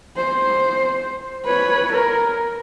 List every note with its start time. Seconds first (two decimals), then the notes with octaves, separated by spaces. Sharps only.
0.17 C5
1.45 B4 C#5
1.93 A#4